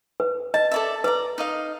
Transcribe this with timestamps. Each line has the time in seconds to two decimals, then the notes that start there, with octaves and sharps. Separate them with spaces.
0.20 B4
0.54 D#5 A5
0.71 A4 D5 E5
1.04 B4 D5 A#5
1.38 D#4 D#5 F5